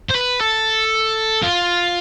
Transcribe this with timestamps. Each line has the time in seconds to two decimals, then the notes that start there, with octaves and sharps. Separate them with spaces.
0.09 C5
0.14 B4
0.39 A4
1.43 F4